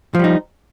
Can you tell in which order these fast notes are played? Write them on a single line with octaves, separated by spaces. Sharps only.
F3 G3 D#4